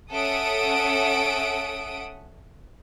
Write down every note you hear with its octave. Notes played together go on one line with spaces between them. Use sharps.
C#4 A4 E5 F#5 D#6 D7